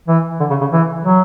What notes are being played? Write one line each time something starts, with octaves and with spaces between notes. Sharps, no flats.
E3
D3
C#3
C#3
E3
F#3